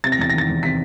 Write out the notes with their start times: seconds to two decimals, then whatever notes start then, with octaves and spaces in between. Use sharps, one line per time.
0.04 C3 A6
0.12 A#6
0.19 E2 A6
0.30 A#6
0.33 D#3 A6
0.49 E2
0.63 C3 B6